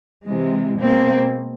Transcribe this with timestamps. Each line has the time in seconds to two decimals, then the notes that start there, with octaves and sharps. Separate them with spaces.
0.26 C3 E3 G#3
0.80 B2 G#3 A#3 C4